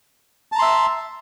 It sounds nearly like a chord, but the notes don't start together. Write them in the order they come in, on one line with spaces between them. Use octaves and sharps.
A5 A#5 C6 E5